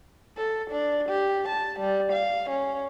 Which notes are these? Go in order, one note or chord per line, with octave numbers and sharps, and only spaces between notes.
A4
D4
G4
A5
G3
F5
C#4